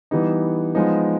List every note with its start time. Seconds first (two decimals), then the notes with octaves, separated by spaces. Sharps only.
0.11 E3 G3 B3 D#4
0.75 F3 G#3 B3 D#4